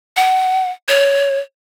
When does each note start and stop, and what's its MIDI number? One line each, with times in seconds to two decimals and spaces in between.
0.17 0.71 78
0.88 1.39 73